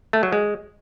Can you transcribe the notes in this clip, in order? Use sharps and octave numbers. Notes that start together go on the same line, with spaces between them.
A3
F#3
G#3